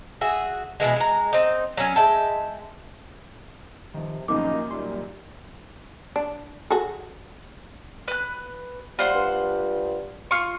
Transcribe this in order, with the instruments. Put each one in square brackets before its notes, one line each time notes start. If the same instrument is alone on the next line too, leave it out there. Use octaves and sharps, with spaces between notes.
[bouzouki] F#4 G#4 E5
B2 D#3 E3 G#3
G#3 A#5
C4 D#4
F#3 C#4
G#3 E5 G5 A5
[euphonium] C3 [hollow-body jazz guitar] D#3 F3
[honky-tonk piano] F#2 A#2 D#3 [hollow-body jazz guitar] F3 B3 C#4 [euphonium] D#4 [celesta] D6
[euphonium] G3 [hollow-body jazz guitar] C6
[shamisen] D4
F#4 G#4 A4
[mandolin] B4 F#6
[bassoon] G3 [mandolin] F4 C5 F#5
[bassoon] G2
[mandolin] F4 C#6